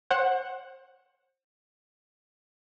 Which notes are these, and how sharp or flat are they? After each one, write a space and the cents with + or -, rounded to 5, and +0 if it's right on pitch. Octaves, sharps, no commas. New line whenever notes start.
C5 +30 F#5 +0